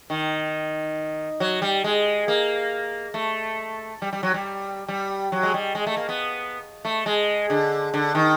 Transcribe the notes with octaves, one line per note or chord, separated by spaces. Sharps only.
D#3
F#3
G3
G#3
A#3
A3
G3
G3
F#3
G3
G3
F#3
G#3
G3
G#3
A3
A#3
B3
A3
G#3
D3
D3
D#3